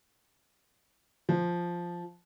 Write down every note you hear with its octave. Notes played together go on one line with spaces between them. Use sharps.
F3